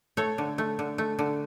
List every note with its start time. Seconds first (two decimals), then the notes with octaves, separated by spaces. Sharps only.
0.17 A3 A4 C#5
0.38 D3
0.58 A3
0.79 D3
0.98 A3
1.19 D3